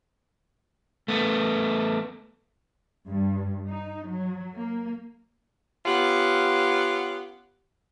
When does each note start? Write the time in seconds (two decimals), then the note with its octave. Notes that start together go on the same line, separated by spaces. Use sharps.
1.08 A3 B3
3.09 G2
3.66 D#4
4.07 F#3
4.55 A#3
5.86 B3 C#4 F4 G4 F#5